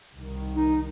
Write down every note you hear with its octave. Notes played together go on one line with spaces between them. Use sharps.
C2 D#3
D#4